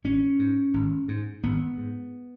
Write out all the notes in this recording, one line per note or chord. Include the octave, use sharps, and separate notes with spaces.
G#1 C#4
G#2
G#1
G#2
G#1 B3
G#2